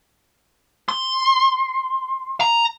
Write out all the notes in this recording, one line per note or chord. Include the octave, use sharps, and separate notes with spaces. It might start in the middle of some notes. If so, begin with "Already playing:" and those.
C6
A#5